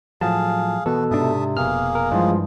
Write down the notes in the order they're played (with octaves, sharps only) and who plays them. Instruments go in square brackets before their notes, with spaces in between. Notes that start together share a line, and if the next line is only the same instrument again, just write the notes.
[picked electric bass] A2 F3 F#3 [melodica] G#4 F5 [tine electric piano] A5
[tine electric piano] B2 A4 [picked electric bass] E3 [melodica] F#4 B4
[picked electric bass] G#2 D4 [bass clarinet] C3 [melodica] E5 A5 D#6
[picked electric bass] F1 B2 [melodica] A#3 G#4 [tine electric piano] F6
[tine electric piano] A#4
[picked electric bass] G2 E3 [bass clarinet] F3 [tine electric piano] G#3 F4